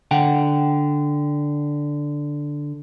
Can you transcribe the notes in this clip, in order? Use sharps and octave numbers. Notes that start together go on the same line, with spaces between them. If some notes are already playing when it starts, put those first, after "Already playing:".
D3 F#5 G5